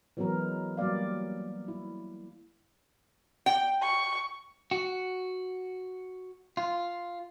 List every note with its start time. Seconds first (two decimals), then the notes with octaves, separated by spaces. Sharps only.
0.17 E3 F#3 G#3 B3 A#4
0.77 F#3 G3 A#3 D5 F5
1.68 E4
3.46 G5
3.82 C#6
4.71 F#4
6.57 F4